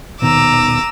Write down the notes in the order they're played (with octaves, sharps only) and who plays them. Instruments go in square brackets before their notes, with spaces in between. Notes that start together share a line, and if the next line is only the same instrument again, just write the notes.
[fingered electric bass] D#1 B2 D#3 [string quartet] A#5 D6 E6